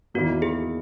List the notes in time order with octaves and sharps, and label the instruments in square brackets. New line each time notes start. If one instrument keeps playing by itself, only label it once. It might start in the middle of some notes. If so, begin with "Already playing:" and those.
[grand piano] E2 D#3 A#3 E4 [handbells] F#4
[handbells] G#4